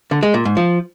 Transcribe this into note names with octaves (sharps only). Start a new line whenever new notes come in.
D3
G#3
A#2
G#2
F3